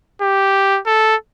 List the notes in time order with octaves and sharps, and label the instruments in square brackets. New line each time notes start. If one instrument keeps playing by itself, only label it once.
[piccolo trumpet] G4
A4